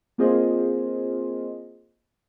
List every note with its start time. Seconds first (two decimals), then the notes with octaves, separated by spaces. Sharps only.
0.18 A#3 C4 F4 G#4 C5 D#5